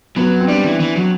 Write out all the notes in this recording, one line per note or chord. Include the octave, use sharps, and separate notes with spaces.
F#3 B3
C4
G3 D4
E3
E3
F#3